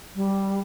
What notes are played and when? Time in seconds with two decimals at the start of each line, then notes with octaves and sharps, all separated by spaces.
0.15 G3